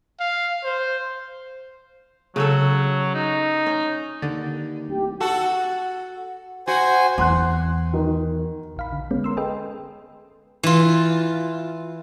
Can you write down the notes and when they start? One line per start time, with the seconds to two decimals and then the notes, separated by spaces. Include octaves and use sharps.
0.20 F5
0.64 C5
2.36 C#3 F#3 C#4 A4
3.15 D#4
3.66 C#4
4.22 D#2 D3
4.89 D1 G4
5.20 F#4 A4
6.67 F#4 C5 G#5
7.18 E2 F#5 C6 F#6
7.93 D#3
8.77 A#1 F5 B5
8.93 D3
9.11 G#3 B3 C#4
9.24 A#4 C6 E6
9.37 G#4 A4 B4 D#5 G5
10.63 E3 F4